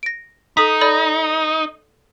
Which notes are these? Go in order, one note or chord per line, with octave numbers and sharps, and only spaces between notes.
A#6 D7
D#4 A4 D#6 B6
A4 D5 B5